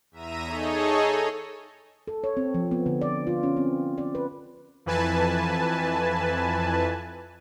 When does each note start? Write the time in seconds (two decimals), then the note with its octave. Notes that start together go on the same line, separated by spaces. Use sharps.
0.11 E2 E5 A#5 D#7
0.44 D#4 G#4 A4 C#5 D#5
2.08 A4
2.24 C#5
2.37 C4
2.54 F3
2.71 B3
2.86 D3
3.01 D5
3.27 F4
3.43 C#4
3.57 C4
3.98 D5
4.15 B4
4.86 F2 E3 B4 G#5 A5